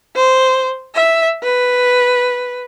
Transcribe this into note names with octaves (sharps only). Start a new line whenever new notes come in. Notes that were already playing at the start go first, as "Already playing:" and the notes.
C5
E5
B4